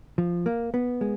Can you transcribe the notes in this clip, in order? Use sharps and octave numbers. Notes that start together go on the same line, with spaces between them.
F3
A#3
B3
G#3